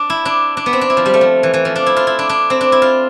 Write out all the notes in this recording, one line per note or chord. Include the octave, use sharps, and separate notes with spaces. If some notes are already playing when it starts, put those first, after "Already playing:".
Already playing: D4
E4
D4
D4
B3
C4
D4
E4
F3
G3
A3
F3
E3
E3
F3
D4
E4
F4
E4
D4
D4
C4
D4
E4
F4